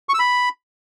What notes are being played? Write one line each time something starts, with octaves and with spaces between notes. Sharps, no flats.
C#6
E6
B5